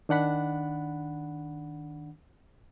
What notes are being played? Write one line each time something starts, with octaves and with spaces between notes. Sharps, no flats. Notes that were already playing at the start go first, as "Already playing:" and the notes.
D#3 D4 F#5 B5